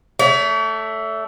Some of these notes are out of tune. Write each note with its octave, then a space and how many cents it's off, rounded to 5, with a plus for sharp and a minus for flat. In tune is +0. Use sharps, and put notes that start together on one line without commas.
A3 +0 C#5 +45